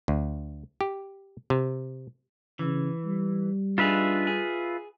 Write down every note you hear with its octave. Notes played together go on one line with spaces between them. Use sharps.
D2
G4
C3
C#3 E3
G3
D4 D#4 F4 G#4 B4 E5
G#4